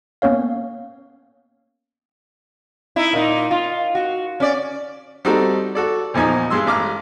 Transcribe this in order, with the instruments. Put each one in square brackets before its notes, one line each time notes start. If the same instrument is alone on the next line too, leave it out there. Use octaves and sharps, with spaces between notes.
[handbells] A#3 B3 C#4 C#5 F5
[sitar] D#4 E4
A#2 D#4
F4
F#4
C#4 D5
[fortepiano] G3 C4 D#4 F#4 A4
F#4 A4 D5
A#1 E2 F3 D#4 G#5
G2 G#3 C6 E6
A1 D6 F6